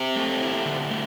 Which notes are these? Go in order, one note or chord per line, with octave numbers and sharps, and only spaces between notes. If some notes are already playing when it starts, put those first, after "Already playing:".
Already playing: C4 G4
A3
E4
D3
A3